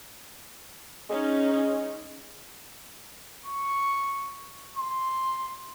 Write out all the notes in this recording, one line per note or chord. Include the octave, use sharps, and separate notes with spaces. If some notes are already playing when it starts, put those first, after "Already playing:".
G#3 C#4 D#4
C#6
C6